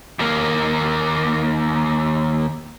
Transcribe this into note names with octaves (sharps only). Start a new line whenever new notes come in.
D#2 A#3